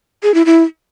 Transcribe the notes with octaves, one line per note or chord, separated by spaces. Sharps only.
G#4
E4
E4